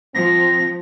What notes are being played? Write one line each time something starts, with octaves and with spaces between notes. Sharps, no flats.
F3 C4 A#6